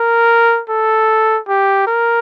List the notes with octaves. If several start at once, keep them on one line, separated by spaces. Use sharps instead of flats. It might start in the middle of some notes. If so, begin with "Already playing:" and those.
Already playing: A#4
A4
G4
A#4